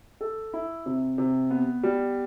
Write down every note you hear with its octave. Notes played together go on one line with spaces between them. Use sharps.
A4
E4
C3
C3
B3
G3